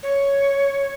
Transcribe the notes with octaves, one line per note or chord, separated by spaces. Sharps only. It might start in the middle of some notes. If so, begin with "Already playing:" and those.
C#5